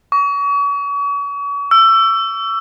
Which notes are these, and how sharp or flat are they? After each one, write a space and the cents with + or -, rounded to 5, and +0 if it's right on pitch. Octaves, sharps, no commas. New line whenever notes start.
C#6 +40
E6 +20